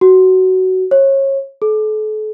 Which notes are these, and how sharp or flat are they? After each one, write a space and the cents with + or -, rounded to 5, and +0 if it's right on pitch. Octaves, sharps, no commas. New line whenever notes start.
F#4 +15
C#5 -30
A4 -40